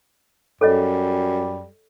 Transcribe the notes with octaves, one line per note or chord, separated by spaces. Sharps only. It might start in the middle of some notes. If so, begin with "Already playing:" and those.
F#2 G3 A4 C#5 D#5